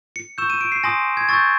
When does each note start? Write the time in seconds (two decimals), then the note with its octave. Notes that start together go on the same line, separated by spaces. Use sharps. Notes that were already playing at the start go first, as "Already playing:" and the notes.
0.16 C#7
0.38 C#6 E6 G6 E7
0.50 D#7
0.61 D7
0.72 C7
0.84 G#5 C6 D#6 A#6
1.17 G#6
1.29 C#6 E6 G6 A6